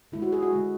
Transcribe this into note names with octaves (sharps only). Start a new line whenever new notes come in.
D3 G#3 E4
F#4
G#4
F#4
D3 G#3